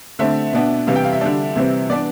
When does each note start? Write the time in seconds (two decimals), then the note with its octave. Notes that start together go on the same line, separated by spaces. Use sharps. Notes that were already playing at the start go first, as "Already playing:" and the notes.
0.19 D3 A3 C4 E5
0.53 B2 B3 D4
0.87 C3 E3 G3 F5
0.96 G5
1.04 F5
1.13 E5
1.21 D3 G3 D4
1.56 C3 E3 G3 C4
1.90 E3 B3 D4 D5